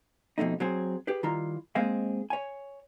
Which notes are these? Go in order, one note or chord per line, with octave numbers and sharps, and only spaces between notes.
F2 B2 A3 D#4
F#3 C4 G#4
G4 G#4 B4
D#3 G3 E4 F4 A#5
G#3 A#3 C4 G#4 D#5 F5
C#5 G#5